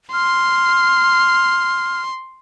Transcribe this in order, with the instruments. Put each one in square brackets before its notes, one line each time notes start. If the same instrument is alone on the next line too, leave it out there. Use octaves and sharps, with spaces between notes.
[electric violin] C6 [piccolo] F6